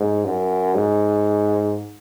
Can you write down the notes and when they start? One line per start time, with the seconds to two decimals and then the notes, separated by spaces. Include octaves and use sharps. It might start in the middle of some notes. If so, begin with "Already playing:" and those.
Already playing: G#2
0.25 F#2
0.75 G#2